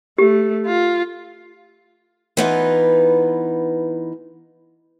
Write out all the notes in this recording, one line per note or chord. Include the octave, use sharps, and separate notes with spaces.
A3 G4
F4
E3 B3 D#4 F4